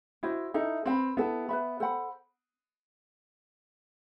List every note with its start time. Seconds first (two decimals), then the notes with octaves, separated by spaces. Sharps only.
0.23 E4 F#4 C5 D#5
0.54 D#4 E4 A4 E5
0.86 C4 B4 F#5
0.90 B5
1.17 B3 E4 A4 E5
1.49 B4 E5 B5
1.80 A4 C5 F#5 B5